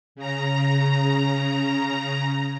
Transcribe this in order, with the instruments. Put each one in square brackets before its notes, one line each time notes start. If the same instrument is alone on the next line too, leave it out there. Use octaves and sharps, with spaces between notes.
[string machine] C#3 A#5